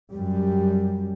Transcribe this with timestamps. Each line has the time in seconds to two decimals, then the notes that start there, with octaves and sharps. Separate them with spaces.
0.13 F#2 G3